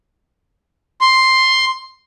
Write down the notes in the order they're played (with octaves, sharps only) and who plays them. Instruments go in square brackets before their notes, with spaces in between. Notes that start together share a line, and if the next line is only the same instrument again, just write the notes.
[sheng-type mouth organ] C6